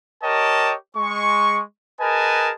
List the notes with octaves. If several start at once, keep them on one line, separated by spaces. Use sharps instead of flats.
G4 A#4 C#5 D#5 G5 A5
G#3 C#6
G#4 A#4 B4 D#5 G#5 A5